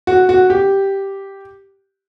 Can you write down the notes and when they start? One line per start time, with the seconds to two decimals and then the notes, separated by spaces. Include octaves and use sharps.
0.07 F#4
0.29 F#4
0.50 G4